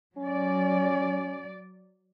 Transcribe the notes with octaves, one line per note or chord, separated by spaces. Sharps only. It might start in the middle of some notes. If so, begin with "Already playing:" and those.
F#3 C#4 D5